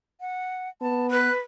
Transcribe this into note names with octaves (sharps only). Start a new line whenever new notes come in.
F#5
B3 A5
B4 F#6